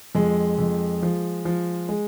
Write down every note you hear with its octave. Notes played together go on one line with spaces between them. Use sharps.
F2 G#3
F2
F3
F3
G#3